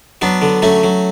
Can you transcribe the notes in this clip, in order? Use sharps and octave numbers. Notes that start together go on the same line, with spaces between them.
F#3 B3 D4
D3
F#3 A3 C#4
F#3